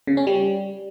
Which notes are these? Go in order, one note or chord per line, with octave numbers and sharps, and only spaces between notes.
C#3
C#4
G3